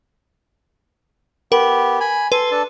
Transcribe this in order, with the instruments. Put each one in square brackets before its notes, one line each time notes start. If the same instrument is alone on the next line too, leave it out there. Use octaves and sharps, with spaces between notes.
[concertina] B3 G4 [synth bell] A#4
[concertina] G#5 B5
[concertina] A4 C6 [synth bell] B4
[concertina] D4 A4 A5